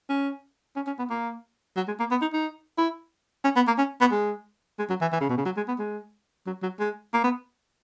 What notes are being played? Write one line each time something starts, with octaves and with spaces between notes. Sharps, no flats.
C#4
C#4
C#4
B3
A#3
F#3
G#3
A#3
B3
D#4
D#4
E4
C#4
B3
A#3
C#4
B3
G#3
G#3
F#3
E3
E3
C#3
B2
C#3
F#3
G#3
B3
G#3
F#3
F#3
G#3
A#3
B3